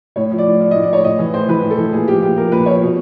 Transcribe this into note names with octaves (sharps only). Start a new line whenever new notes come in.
A2 C#5
F3
D5
A2
F3 D5
A2 D#5
D5
F3 C#5
A2 D#5
E3
A2 C5
E3 B4
A2
A4
E3
A#2 G#4
F3 G4
A#2 G4
F3 A#4
A#2 B4
F3 C#5
B2